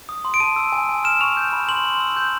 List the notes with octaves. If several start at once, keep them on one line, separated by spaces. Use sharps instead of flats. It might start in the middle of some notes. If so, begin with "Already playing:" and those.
D#6
C6
D7
A5 D#7
E6
G#5
G#5
F6 E7
C#6 F7
G6
B5
C6 F#7
C6
E6
G6